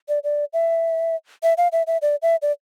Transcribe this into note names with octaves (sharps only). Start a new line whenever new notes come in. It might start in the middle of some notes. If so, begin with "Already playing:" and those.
D5
D5
E5
E5
F5
E5
E5
D5
E5
D5